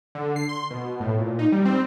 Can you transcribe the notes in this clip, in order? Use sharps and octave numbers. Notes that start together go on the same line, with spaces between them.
D3
C7
C6
B2
A2
A#2
D#4
G3
C4